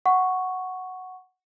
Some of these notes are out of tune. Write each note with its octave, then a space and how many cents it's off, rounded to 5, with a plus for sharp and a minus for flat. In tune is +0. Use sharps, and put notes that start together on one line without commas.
F#5 +0 C#6 +0